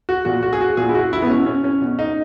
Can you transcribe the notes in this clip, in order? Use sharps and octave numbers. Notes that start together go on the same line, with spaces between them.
F#4
A#2 F#4
F#4
G#4
F#4
A#2 G#4
E4
F#4
E4
B3
B2 C#4
C#4
C#4
B2
D#4